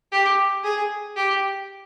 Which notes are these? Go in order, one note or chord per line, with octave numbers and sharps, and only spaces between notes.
G4
G#4
G4